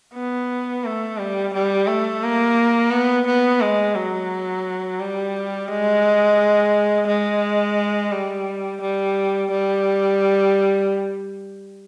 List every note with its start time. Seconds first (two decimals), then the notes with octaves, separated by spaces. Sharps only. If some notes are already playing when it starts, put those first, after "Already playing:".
0.14 B3
0.84 A3
1.18 G3
1.54 G3
1.87 A3
2.23 A#3
2.91 B3
3.27 B3
3.61 G#3
3.96 F#3
5.00 G3
5.68 G#3
7.07 G#3
8.11 G3
8.81 G3
9.51 G3